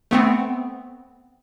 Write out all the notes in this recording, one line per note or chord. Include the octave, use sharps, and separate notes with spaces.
A3 B3 C4